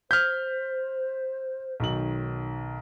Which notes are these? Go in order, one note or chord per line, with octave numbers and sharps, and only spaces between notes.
C5 F6 G6 B6
B1 D#3 F#7